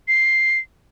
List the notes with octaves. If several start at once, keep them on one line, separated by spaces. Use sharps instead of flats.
C7